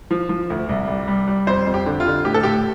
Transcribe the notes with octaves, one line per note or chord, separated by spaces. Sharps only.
F3
F3
D2
C2
G3
G3
G3
F2 C5
F2
G4
D3
F4
D3
A2 G4
A4
A2 G4